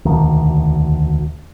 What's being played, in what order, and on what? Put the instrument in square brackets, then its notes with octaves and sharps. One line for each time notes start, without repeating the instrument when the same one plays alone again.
[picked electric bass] E1 D2 D#3